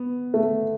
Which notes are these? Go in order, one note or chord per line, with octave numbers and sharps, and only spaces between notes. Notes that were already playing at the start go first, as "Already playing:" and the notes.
Already playing: B3
A3